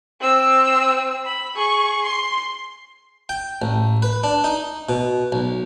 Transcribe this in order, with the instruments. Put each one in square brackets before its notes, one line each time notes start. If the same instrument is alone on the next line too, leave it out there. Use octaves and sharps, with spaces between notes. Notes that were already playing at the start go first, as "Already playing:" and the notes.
[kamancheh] C4 E6
B5
G#4 C#6
C6
[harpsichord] G5
A1
B4
D4
D#4
B2
B1